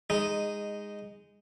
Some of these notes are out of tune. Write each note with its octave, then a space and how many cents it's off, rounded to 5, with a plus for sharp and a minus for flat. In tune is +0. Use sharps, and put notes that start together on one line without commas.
G#3 -15 D#4 -5